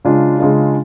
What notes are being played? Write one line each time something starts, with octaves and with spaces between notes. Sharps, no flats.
C#3 G#3 D4 F4
C#3 G#3 D4 F4